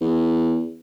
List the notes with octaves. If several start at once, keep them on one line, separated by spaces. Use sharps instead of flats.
E2